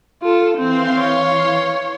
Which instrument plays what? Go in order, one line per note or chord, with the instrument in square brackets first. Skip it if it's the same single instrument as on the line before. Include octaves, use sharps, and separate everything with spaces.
[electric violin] F4 A4
[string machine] E3 F5 C6 [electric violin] C4
[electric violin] C#5